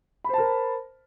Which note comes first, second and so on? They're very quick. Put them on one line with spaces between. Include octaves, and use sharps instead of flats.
B5 C5 A5 A#4